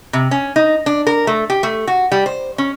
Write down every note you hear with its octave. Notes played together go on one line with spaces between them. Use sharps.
C3
C#4
D#4
D4
A#4
A3
G4
A3
F#4
G3
C5
C#4